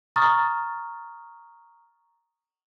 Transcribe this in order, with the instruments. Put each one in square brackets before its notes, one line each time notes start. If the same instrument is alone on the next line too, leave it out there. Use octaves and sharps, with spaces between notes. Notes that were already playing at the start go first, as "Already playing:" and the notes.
[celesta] A#5 C#6 D#6 F6 A6